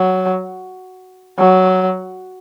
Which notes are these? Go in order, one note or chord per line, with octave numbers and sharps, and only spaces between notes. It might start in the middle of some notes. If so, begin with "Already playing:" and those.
Already playing: F#3
F#3